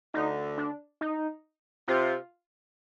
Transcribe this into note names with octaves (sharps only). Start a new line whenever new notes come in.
D2 D3 D#4
D4
D#4
C3 F4